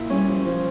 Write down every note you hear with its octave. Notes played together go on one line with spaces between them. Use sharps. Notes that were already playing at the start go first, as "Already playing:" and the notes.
Already playing: A#2 E4
G3 C#4
F3
F3